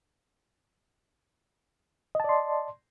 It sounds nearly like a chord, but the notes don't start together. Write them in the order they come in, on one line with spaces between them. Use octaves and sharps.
D#5 A5 D5 C6